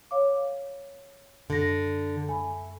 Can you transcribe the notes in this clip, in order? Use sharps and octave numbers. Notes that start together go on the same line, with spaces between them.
C#5 F5 D6
F#2 D3 A4 A#6
A3 G#5 B5